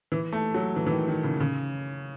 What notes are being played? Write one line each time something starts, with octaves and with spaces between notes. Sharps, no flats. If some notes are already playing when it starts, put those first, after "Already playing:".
E3
A3
F#3
E3
E3
D#3
D#3
C#3
C#3